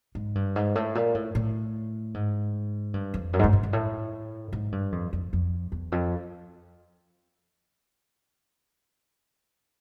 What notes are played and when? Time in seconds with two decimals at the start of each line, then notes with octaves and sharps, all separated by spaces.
0.15 G#2
0.35 G2
0.56 G#2
0.75 A2
0.95 A#2
1.15 A2
1.35 A2
2.14 G#2
2.94 G2
3.14 F2
3.33 F#2
3.39 G#2
3.44 G2
3.53 G#2
3.63 G#2
3.73 A2
4.53 G#2
4.72 G2
4.92 F2
5.13 F2
5.33 F2
5.72 E2
5.92 F2